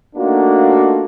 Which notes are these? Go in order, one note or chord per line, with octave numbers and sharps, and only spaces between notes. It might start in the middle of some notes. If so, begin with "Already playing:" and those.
A3 A#3 D4 D#4 F4 F#4